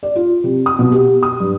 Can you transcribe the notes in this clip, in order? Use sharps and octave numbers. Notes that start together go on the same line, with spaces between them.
D5
F4
C3
D#6
B2
G4
D#6
G2